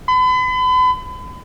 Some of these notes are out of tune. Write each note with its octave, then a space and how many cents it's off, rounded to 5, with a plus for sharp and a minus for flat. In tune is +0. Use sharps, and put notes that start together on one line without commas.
B5 +40